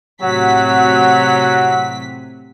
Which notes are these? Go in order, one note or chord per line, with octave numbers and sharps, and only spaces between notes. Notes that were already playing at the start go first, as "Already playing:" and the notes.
A2 C3 F#3 F#4 F#5 B6